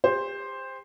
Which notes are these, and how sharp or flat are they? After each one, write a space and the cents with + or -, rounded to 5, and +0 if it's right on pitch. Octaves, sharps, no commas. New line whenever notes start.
G4 +40 C5 +5